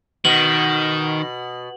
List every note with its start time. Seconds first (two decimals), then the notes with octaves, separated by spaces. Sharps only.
0.25 B2 D#3 F#7